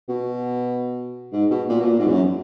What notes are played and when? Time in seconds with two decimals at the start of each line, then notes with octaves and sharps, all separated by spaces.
0.09 B2
1.32 G#2
1.50 B2
1.69 A#2
1.80 B2
1.86 A#2
1.99 G#2
2.07 E2
2.12 F#2